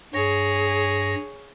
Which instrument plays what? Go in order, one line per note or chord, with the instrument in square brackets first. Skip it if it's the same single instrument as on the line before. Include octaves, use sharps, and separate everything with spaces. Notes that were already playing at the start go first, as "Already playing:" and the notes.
[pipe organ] G2 A#6 [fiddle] G#4 C#5